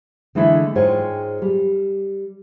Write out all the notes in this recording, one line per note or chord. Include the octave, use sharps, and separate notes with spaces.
D3 E3 G#3 A3 E4
G#2 G#3 F4 C5 C#5 G5
G3